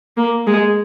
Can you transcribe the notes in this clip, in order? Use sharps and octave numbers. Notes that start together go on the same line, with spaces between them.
A#3
G#3